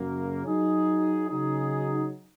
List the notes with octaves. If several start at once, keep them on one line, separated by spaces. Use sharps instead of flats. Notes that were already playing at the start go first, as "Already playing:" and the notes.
Already playing: F#2 C#3 F#3 A#3
F#3 D#4 G#4
C#3 F#3 D#4 G#4